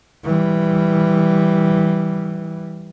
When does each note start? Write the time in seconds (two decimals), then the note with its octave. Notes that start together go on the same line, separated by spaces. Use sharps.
0.24 E3 G3